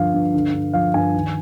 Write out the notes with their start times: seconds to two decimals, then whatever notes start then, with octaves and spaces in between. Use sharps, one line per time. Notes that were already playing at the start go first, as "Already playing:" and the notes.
Already playing: G2 D3 F3 F5
0.14 G2
0.34 D3
0.54 G2
0.74 F3 F5
0.94 G2 G#5
1.14 D#3